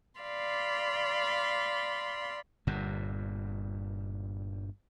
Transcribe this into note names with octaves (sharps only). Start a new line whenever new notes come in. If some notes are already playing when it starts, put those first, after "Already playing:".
D5 F5 B5 C6
G1 G2 A#2